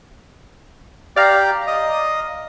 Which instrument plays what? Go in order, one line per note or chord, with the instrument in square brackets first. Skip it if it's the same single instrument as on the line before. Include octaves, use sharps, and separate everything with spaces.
[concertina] G4 [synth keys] D5 F5 A#5
[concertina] D#5